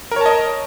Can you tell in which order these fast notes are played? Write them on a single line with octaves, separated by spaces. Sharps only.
A#4 C#5 A5 D#5